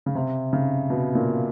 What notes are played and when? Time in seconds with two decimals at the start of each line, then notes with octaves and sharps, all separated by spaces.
0.06 C#3
0.15 C3
0.53 C#3
0.90 B2
1.15 A#2